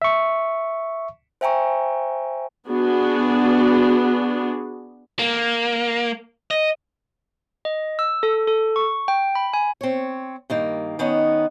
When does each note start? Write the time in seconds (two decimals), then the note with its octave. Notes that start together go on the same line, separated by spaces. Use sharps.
0.02 E5 C#6
1.41 C5 E5 G5 G#5 A#5 C#6
2.68 B3 D4 F#4 G#4
5.19 A#3
6.51 D#5
7.65 D#5
7.99 E6
8.23 A4
8.47 A4
8.76 C#6
9.08 G5
9.35 B5
9.54 G#5
9.81 C4 C#5
10.50 G2 D#3 A#3
10.99 D#3 B3 C#4 D#4